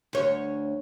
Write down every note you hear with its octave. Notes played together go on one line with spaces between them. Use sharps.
D2 C#5